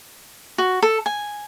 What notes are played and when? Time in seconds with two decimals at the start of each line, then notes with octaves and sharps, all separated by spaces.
0.58 F#4
0.82 A4
1.06 G#5